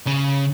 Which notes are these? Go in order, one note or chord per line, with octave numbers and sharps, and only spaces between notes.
C#3